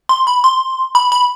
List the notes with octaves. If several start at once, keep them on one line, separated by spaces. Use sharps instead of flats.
C6
B5
C6
B5
B5